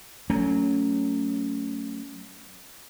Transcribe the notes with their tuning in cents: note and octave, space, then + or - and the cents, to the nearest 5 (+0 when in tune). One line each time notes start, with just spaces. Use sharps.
F#3 +0 A3 +25 C#4 +10